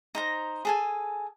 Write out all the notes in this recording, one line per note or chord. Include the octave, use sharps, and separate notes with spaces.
D#4 C5 A#5
G#4 A4 G#5